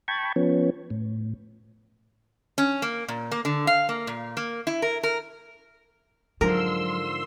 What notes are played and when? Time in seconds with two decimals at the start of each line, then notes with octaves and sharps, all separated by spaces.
0.08 G5 A5 B5 C#6 G#6
0.36 F3 B3 C#4
0.90 A2
2.58 C#4
2.82 A#3
3.08 A#2
3.32 A#3
3.45 D3
3.67 F5
3.89 A#3
4.07 A#2
4.37 A#3
4.67 E4
4.82 A#4
5.03 A#4
6.41 G#2 D3 F3 F#3 A#4 C6 E6